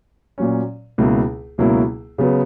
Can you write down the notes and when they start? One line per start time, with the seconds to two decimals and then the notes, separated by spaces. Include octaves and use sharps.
0.38 A#2 F#3 C#4
0.98 C#2 B2 F#3 A#3 E4
1.58 C#2 B2 F#3 A#3 E4
2.18 C#3 F#3 B3